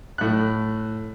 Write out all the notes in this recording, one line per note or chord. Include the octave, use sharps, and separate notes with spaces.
A2 F#6